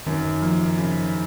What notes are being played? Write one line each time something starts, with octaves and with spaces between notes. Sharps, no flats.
F#2 D#3
F3 A#3
C#3